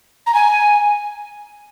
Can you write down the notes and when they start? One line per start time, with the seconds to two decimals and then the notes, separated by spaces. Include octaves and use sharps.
0.27 A#5
0.34 G#5